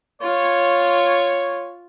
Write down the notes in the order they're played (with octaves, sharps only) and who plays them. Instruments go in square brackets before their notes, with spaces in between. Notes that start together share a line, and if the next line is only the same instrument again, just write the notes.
[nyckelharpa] F4 [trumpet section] C#5